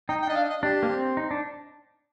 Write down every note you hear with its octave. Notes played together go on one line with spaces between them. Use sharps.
D#4 G5
G5
D4 D#5
F5
D#5
D4 G4
A#3
C4
D#4
D4